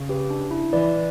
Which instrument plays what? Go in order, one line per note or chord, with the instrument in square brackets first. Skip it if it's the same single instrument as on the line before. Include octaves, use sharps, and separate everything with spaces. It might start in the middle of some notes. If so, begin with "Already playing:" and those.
Already playing: [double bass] C#3
[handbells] G4 B4
D4
E4
[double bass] E3 [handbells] B4 D5